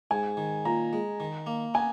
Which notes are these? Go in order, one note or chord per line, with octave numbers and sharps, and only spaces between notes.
G#2 G#5
D#3
A#2 A#5
G#3
D#3
A#3
B3 G#5